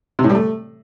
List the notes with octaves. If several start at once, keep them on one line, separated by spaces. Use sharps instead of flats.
C3
A2
G3
A3